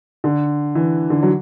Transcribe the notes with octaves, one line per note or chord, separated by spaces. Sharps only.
D3
E3
D3
F#3